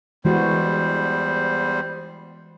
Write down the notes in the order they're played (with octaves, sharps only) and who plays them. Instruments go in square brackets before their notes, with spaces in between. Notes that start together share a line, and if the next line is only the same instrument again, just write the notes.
[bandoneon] E2 G3 C5 [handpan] E3 G#3 F#4